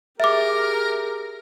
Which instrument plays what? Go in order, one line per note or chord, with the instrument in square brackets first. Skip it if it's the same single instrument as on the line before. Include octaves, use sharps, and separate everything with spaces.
[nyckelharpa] G4 G#4 [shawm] A#4 [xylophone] E5 D6